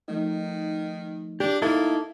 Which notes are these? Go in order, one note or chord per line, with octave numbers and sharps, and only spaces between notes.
D#3 F3 A3 D#4
D4 G4
A#3 D#4 E4 A4